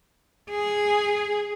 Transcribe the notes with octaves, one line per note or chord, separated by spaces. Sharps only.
G#4